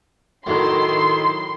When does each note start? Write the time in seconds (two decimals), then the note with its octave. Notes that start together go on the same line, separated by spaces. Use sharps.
0.46 A2 D#3 F#3 E4 C6